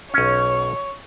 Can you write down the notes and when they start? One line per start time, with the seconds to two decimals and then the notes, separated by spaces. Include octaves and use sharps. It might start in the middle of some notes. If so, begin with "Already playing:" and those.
0.14 B1 C#4 C#5